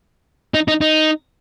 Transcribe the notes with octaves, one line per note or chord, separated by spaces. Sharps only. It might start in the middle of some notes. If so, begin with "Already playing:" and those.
D#4
D#4
D#4